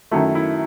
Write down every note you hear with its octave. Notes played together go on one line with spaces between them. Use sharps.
F#2 D#3 F#3 A3 E4
E4